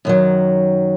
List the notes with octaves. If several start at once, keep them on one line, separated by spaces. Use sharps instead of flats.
F#2 D#3 F#3